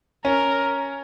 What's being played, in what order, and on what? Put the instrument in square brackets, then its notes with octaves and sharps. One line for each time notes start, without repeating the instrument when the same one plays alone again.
[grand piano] C#4 [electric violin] A#4